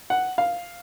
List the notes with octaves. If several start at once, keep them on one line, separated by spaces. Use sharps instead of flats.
F#5
F5